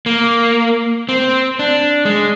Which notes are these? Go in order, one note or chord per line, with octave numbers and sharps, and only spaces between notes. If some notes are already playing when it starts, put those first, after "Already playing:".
A#3
C4
D4
G#3